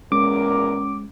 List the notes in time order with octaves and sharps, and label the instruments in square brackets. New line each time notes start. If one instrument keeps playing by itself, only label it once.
[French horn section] E2 A#2 A#4 [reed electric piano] G#3 [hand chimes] C#4 [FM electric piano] D6